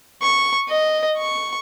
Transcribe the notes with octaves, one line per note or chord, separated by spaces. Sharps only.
C#6
D#5
C#6